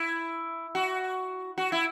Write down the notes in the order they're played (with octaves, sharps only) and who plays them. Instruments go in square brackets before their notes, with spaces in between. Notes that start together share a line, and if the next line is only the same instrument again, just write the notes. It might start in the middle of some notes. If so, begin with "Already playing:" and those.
Already playing: [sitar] E4
F#4
F#4
E4